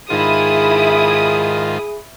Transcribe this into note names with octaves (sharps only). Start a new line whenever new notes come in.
G#2 D#3 E4 F4 G#4 D#6